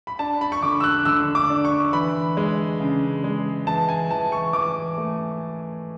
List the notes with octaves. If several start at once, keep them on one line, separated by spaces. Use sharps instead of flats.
B5
D4 A5
B5
C#6
D3 D6
E6
F#6
D3 E6
D6
D4
C#6
E3 B5
G#3
C#3
G#3
E3 A5
G#5
E3 A5
C#6
E3 D6
A3